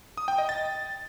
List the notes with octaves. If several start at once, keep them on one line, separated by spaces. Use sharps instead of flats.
D#6
G5
D#5
A6